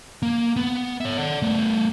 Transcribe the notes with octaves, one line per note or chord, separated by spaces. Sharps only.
A#3
B3
C#5 E5
D5 F#5
A3 B3